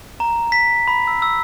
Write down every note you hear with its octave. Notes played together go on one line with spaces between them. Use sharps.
A#5
B6
B5
E6
E6